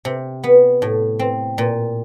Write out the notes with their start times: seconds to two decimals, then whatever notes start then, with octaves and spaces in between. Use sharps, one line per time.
0.05 C3
0.44 B3
0.82 A2
1.19 C4
1.58 A#2